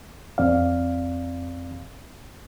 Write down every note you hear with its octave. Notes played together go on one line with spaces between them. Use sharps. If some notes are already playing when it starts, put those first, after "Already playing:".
F2 C4 D5 F5